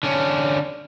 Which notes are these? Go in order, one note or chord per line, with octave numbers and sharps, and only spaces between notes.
D3 C#4